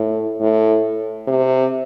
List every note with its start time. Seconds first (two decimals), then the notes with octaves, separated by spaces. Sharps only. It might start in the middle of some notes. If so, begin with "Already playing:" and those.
Already playing: A2
0.40 A2
1.27 C3